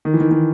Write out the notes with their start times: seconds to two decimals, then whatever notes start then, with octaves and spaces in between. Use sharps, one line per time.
0.05 D#3
0.14 E3
0.20 D#3
0.31 D#3